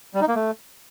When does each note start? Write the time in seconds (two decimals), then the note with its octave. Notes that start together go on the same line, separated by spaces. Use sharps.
0.14 G3
0.21 D#4
0.28 A#3
0.35 A3